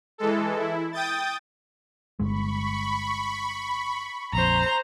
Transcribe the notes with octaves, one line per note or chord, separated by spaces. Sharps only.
E3 G#3 A4
E4
G5 D#6 G6 A6
G1 G#3 B5 C#6
A#1 F2 C5 A#5